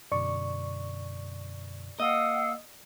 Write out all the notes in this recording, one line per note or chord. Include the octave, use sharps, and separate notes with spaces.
F#2 B2 D3 D5 C#6
A#3 D#5 F5 F#5 E6